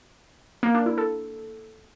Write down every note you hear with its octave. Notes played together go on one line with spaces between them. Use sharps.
A#3
D4
E4
A4